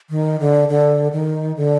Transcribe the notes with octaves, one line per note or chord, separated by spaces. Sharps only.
D#3
D3
D3
D#3
D3